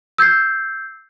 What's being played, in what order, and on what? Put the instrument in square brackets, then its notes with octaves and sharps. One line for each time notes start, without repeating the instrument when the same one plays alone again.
[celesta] E6 G6 G#6 C7